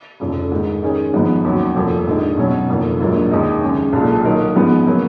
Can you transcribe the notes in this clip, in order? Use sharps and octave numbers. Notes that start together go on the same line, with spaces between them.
F1 F2 C#3
G#2 D#3 G#3
D#3 G#3 C#4 G#4
G#1 G#2 F3 B3 D#4
D#2 C#3 F#3 C#4 F#4
F1 F2 F3 A#3
A#1 G#2 D#3 G#3
B2 F#3 C#4
F#1 F2 D#3 A#3
A#1 G#2 F#3 A#3 F4
D#2 D#3 G#3 D#4
F#2 C#3 G#3
B1 A#2 G#3
D#3 F#3 A#3 D#4 A#4
G#2 F3 G#3 B3
C#3 F#3 A#3